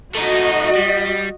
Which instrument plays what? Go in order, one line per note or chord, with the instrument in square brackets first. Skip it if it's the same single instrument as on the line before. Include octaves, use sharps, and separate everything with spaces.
[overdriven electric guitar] A3 D#4 [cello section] F#4 D#5
[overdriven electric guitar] G3